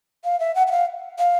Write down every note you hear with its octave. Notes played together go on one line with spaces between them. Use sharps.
F5
E5
F#5
F#5
F5
F5